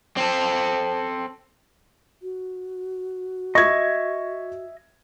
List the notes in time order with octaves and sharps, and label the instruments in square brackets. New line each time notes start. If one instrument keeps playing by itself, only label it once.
[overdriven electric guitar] C4 A4
[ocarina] F#4
[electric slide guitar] D#5 E5 [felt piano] C#6 G#6